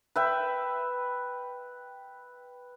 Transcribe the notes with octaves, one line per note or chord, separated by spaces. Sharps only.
B4 E5 G5